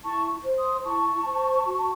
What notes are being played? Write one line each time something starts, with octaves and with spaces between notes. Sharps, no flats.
E4 A5 C#6
C5
C6 D#6
E4 A5 C#6
C5
F#4